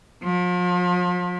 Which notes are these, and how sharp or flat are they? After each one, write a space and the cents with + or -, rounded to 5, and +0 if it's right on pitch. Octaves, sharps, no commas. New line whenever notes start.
F3 +40